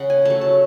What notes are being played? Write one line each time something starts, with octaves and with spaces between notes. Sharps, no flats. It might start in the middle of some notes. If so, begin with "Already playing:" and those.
Already playing: C#3 F#5
G#5
F#3 A3 A5
A5